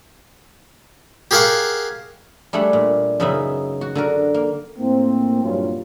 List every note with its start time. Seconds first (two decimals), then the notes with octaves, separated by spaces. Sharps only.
1.31 G4 G#4 A#4 F5 F#5 C#6
2.53 G3 A3 D4 G#4 F#5
2.73 A#2
3.20 F#2 C#3 B3 D#4 E5
3.81 F#4
3.95 D3 F#4 A#4
4.34 A#3
4.78 A2 A#3 C4
5.43 C2 G2 A#2 F#3 C#4 F4